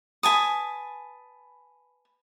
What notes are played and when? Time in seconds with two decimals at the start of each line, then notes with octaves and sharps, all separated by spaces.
0.23 B4 G#5 A5 D#6